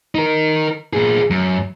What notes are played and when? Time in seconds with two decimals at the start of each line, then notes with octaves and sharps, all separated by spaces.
0.15 D#4 A#4
0.93 A#2 G#4
1.30 F#2